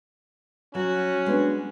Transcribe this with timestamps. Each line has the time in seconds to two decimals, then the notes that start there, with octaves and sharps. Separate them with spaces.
0.75 F#3 C#4 F#4
1.26 G#3 B3 D4